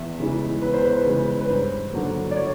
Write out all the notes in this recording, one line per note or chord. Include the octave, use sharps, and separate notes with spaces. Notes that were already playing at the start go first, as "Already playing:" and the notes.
Already playing: E2 E5
C#3 E3 G#3
E2 B4
C5
B4
C#3 E3 G#3
B4
G2 C5
D3 F#3 A#3
D5
C#5